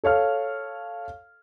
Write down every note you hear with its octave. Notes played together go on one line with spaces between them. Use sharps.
A4 C#5 F5 F6